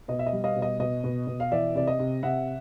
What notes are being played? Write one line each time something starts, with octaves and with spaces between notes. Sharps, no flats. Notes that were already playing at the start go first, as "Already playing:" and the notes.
B2 D#5
E5
D#5
G3
D#5 F5
B2
D#5
B2 D#5
B2
B2
F5
E3 D5 E5
C3 D5
D#5
C3
C3 E5 F#5